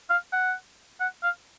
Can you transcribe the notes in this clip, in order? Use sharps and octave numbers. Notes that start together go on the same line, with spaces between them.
F5
F#5
F#5
F5